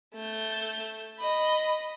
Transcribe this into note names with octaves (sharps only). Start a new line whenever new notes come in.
A3 G6
D#5 B5